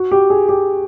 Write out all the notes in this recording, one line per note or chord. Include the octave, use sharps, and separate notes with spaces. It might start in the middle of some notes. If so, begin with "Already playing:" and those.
Already playing: F#4
G4
G#4
G4